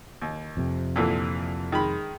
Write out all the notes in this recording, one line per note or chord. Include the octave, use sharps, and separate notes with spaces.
D#2
F2 C3
A#2 D3 E3
D#3 G#3 B5